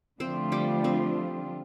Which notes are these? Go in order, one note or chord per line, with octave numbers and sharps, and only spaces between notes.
D3 F3 A3 C4 D4 F4 C5
G3 G4
C4 C5